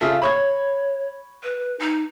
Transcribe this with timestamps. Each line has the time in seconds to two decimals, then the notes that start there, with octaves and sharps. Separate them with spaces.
0.01 C#3 F4 A4 E5
0.22 C#5 B5 C#6 G#6
1.43 B4
1.80 D#4